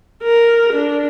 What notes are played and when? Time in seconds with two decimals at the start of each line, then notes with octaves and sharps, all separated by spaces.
0.23 A#4
0.73 D4